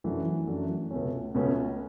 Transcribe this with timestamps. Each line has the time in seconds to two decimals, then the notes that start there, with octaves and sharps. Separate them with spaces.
0.04 F#2 E3 A3 D4 F#4
0.47 F#2 E3 A3 D4 F#4
0.91 C#2 B2 A3 C#4
1.35 C#2 B2 A3 C#4